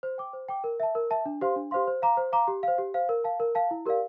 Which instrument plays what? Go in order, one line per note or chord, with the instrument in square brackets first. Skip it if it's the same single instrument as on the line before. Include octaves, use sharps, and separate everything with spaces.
[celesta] C5
G5 D6
C5
G5 D6
A#4
E5 A5
A#4
E5 A5
D4
G4 C5 F5 C6
D4
G4 C5 F5 C6
C5
F5 A#5 D6
C5
F5 A#5 D6
G4
C5 F5
G4
C5 F5
A#4
F5 A5
A#4
F5 A5
E4
G4 A#4 D5 F5